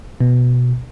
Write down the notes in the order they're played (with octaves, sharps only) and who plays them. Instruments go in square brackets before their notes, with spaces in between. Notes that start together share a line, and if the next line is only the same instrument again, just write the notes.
[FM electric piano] B2